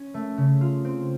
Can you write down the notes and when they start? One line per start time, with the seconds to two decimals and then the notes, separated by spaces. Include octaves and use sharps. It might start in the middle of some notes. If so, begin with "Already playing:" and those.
Already playing: C#4
0.14 A3
0.38 C#3
0.61 F4
0.85 C4